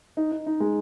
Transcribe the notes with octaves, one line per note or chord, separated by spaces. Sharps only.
D#4
D#4
D#4
G#3